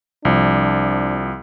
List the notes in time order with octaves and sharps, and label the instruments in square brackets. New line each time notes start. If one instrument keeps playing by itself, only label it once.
[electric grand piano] C2 F3 [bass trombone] D4